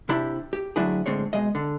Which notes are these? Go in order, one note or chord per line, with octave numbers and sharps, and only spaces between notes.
C3 D4 E4 G4 B5
G4
D2 F#3 D4 E4 G#4
A2 D3 G#3 C4 C#5
B2 G#3 D#5
D3